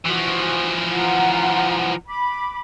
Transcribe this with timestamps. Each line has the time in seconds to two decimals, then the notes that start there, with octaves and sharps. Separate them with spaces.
0.06 E3 F3 F#4
0.92 F4 F#5 A#5
2.07 B5 D6